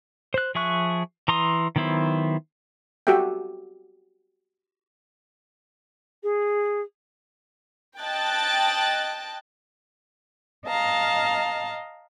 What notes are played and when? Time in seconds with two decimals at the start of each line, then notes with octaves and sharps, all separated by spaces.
0.34 C5 F#6
0.55 F3 G#4 E5 C#6 F#6
1.28 E3 A#5 C6 D#6
1.76 D#3 F#3 B3 E4 C5
3.07 F#4 G4 A4 E5 G5
6.23 G#4
8.00 D#5 G5 A5 F#6 A6
10.67 D#5 F5 A5 A#5